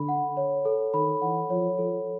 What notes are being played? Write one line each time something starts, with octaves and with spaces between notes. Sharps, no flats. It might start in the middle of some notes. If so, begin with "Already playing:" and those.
Already playing: D3 A4 B5
F#5
C#5
A4
D#3 B5
E3 F#5
F3 C#5
F3 A4